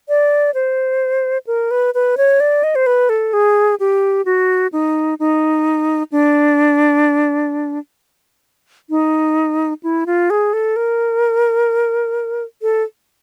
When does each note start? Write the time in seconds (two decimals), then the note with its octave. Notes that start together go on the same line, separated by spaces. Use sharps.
0.09 D5
0.54 C5
1.47 A#4
1.71 B4
1.94 B4
2.17 C#5
2.40 D5
2.63 D#5
2.75 C5
2.86 B4
3.09 A4
3.33 G#4
3.80 G4
4.25 F#4
4.73 D#4
5.20 D#4
6.12 D4
8.90 D#4
9.83 E4
10.06 F4
10.30 G#4
10.53 A4
10.76 A#4
12.62 A4